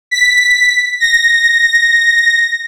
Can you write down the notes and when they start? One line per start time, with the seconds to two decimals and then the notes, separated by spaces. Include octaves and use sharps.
0.11 B6
1.00 A#6